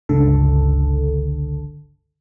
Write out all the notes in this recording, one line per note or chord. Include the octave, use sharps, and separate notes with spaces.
G1 C#2 D3 A4